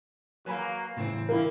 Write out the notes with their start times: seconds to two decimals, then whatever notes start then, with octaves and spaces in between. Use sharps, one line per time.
0.46 F#3 A#3 B4 G#5 B5
0.97 A2 C#3 E3 C4
1.29 D3 A#3 E4 A#4